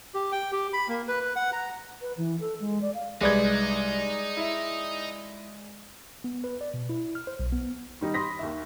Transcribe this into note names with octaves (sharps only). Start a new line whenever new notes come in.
G4
G5
G4
B5
A#3
B4
B4
F#5
A#5
B4
E3
A4
G#3
D5
F5
C2 G#3 D#4 B4 D5 G#6
E4
B3
B4
D5
B2
E4
F6
C5
B1
B3
D#3 G3 D#4
B5 C6 D#6 A#6 B6
D#2 D#3 E5